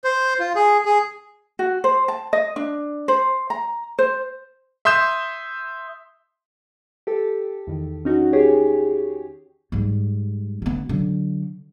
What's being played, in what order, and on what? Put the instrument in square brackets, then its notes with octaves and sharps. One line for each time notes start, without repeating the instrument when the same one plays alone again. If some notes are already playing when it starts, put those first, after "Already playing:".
[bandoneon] C5
F4
G#4
G#4
[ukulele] F#4
C5
A5
D#5
D4
C5
A#5
C5
[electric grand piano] E5 C6 D#6 G6 E7
[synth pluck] G4 A4
E2 D#3
C#4 D#4 F#4
G4 G#4 C#5
[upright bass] G#2 G3
D3 B3
D3 F#3